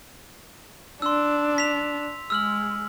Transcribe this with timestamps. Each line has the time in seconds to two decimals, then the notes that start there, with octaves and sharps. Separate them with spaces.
1.02 D4 C6 E6
1.58 B6 F7
2.30 G#3 E6 F6 F#7